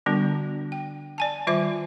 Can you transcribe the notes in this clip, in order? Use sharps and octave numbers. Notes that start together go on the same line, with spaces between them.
D3 G3 B3 D4 F#4
G5
D5 G#5 A5
D#3 G3 F4 C5 E5 D6